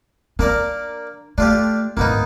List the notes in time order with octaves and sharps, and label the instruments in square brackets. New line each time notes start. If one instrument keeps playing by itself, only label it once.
[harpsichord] A#3 A#4 D5 [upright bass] D4
[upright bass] A3 [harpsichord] D4 F4 G4
[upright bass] D1 G#2 [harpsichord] A#3 B3 D#4